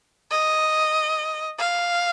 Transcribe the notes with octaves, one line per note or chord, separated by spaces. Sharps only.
D#5
F5